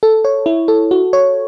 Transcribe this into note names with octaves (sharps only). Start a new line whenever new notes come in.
A4
C#5
E4
A4
F#4
C#5